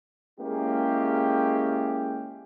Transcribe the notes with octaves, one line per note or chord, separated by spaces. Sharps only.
G#3 A#3 C#4 E4 G4 G#4